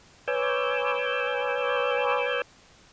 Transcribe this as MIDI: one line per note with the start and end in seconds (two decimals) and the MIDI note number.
0.28 2.42 71
0.28 2.42 73
0.28 2.42 80
0.28 2.42 86
0.28 2.42 88
0.28 2.42 91